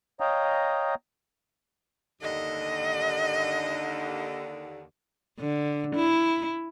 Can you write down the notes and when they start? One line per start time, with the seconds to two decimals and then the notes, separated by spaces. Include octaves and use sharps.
0.20 C#5 D#5 F5 G5 A#5 D#6
2.22 D#2 D3 D#5
5.40 D3
5.96 E4